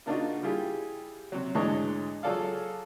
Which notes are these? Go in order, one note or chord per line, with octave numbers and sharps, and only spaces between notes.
C#3 A#3 D4 D#4 F4 F#4
G3 E4 F4 G4 G#4
C3 F#3
D2 G#2 E3 D4 C#5 D#5
F#3 F4 G#4 A4 D5 F5